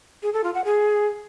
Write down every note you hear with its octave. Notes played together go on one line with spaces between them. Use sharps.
G#4
A4
F4
F#5
G#4